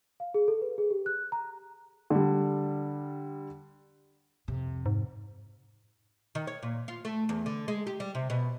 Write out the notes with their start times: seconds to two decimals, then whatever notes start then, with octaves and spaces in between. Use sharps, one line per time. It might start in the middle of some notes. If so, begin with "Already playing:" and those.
0.20 F5
0.34 G#4
0.48 A4
0.62 B4
0.78 G#4
0.91 G4
1.06 F#6
1.32 A#5
2.10 D3 G3
4.48 F2 C3
4.86 G#2
6.35 D#3
6.47 C#5
6.63 A#2
6.88 F4
7.05 A3
7.29 E2
7.46 D3
7.68 G#3
7.87 G4
8.00 G3
8.15 C3
8.30 B2